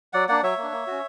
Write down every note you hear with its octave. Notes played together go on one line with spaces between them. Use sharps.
F#3 D5 F#5
A#3 D4 D5 F#5
F#3 C#5 E5
A#3
D4
A#3
C#4 F#4